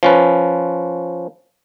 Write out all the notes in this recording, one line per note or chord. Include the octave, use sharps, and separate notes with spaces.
F3 C#4 B4